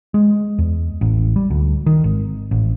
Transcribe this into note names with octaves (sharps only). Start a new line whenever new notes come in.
G#3
E2
A1
G3
D2
D#3
G#1
A1